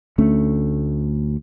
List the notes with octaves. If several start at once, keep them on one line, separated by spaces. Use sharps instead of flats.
D2 A3 C#4